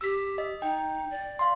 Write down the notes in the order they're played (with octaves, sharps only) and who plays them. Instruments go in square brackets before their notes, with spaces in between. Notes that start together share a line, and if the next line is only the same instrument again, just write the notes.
[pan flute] G4 [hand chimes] E6 B6
[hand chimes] D#5
[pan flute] D#4 [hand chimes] G5
[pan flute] D5
[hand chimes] F5 C6